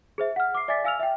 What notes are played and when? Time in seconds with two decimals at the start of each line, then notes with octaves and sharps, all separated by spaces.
0.18 G#4 C5 E5
0.36 F#5 F6
0.55 D6 C7
0.68 D5 E5 G#5 D6 A6 B6
0.84 F5 G#5 E6 F6 F7
1.00 E5 G5